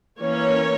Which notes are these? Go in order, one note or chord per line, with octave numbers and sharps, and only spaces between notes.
E3 A#3 C#4 A#4 C#5